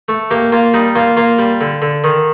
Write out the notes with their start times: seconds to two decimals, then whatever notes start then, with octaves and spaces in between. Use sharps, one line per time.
0.09 A3
0.31 A#3 G4
0.52 A#3 F4
0.74 G3 D#4
0.95 A#3 F4
1.17 A#3 F4
1.38 G3
1.61 D3
1.82 D3
2.04 D#3